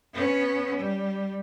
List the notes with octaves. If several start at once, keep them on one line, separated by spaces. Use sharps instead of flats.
B3 C#4
G3